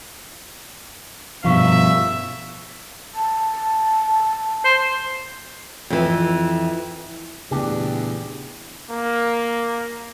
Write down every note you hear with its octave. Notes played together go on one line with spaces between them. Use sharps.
G2 B2 F3 E5 F5 C#6
A5
C5
F2 E3
E2 A#2 C#3 A3 D4 G4
A#3